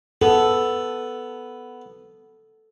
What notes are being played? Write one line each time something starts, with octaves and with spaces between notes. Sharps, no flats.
B3 A4